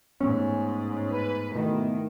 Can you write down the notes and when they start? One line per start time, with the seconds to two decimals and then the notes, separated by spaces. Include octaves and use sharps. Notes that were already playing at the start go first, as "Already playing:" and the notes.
0.20 G#2 E3 A3 B3 C#4
1.10 B4
1.55 B2 D#3 A3 E4 D#5